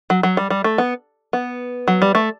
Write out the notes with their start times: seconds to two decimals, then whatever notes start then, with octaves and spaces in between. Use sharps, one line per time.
0.10 F#3
0.23 F#3
0.37 G3
0.50 G3
0.64 A3
0.78 B3
1.33 B3
1.88 F#3
2.02 G3
2.15 A3